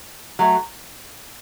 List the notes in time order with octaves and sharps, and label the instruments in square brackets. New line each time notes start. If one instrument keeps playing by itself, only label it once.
[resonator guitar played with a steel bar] F#3 A3